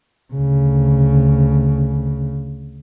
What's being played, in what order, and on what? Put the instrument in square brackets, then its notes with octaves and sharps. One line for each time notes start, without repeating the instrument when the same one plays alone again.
[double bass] D2 C#3